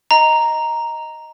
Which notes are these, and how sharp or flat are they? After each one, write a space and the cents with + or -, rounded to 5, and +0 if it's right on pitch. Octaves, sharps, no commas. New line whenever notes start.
D#5 +0 A#5 +0